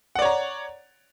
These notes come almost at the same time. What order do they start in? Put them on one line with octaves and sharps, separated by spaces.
F#5 D5 C#5 A#5